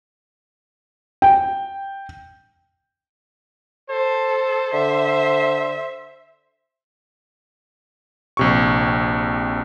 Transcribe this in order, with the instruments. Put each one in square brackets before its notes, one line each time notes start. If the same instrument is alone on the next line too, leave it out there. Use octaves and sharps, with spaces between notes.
[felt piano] G5
[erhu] A4 [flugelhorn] C5
[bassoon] D3 [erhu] E5
[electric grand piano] A#1 C3 C#6